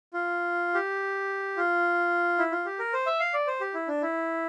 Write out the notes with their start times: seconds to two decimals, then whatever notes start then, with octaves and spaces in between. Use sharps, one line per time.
0.13 F4
0.74 G4
1.57 F4
2.38 E4
2.52 F4
2.66 G4
2.79 A#4
2.93 C5
3.06 E5
3.20 F5
3.34 D5
3.47 C5
3.61 G4
3.74 E4
3.88 D4
4.02 E4